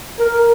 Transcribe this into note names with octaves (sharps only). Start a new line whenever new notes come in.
A#4